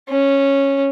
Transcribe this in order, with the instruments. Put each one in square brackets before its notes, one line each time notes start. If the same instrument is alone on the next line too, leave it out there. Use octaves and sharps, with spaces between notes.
[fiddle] C#4